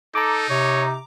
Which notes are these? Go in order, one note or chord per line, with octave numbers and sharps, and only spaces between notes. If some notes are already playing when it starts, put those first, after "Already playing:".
D#4 A4 A#5 D6
C3 C#5